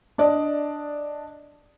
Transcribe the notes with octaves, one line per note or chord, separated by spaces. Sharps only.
D4 D5 D#5